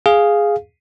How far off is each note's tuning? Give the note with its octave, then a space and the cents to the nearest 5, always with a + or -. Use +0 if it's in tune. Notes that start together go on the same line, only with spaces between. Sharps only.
G#4 +0 F5 +0